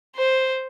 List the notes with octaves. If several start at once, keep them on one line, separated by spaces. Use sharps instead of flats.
C5